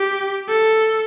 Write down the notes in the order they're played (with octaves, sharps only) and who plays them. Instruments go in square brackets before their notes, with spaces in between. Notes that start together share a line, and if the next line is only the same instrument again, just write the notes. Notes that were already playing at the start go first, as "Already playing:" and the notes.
Already playing: [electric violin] G4
A4